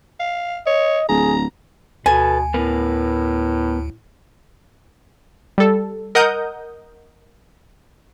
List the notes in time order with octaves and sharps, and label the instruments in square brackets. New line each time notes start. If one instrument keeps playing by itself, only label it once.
[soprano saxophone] F5
[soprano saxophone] C#5 [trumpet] D#5
[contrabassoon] D1 [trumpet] G#4 [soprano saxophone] A#5
[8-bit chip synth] D2 [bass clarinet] B2 [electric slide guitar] A4 B4 [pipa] G#5
[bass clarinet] A2 [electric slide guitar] B3 A#4 B4
[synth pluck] G3 A4
A#4 D#5 F#5 A#5 D#6 G6